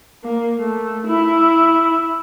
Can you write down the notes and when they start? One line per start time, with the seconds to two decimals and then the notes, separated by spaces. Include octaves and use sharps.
0.24 A#3
0.60 A3
1.07 E4